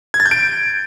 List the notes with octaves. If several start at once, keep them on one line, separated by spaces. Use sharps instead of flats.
G#6
A6
G6
D7